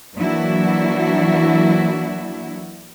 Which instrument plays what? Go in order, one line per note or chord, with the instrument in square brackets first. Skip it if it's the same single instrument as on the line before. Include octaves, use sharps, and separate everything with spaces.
[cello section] E3 F#3 A#3 D4 E4 F#4